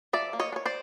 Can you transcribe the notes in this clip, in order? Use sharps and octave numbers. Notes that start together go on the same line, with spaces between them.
F3 D5 E5
A#3
C#5 D#5
D4
C#5
C5 D5